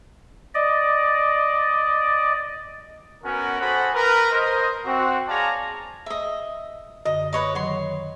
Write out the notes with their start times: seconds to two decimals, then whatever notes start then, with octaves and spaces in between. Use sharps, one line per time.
0.55 D5 D#5
3.23 B3 C#4 F#4 A#4
3.59 F#4 G#4 A4 C5 F#5 B5
3.93 A#4 B4
4.31 A#4 C5 D#5
4.85 C4 F#4
5.28 G#4 C#5 D5 F5 A5 A#5
6.06 D#5 E5
7.05 F#2 D3 D#5
7.33 B4 C#5 D#5
7.55 D#3 F#3 C#5 C6